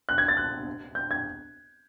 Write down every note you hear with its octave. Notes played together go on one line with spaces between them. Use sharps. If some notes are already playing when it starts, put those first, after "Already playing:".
F#6
G#6
A6
F#6
G6
G#6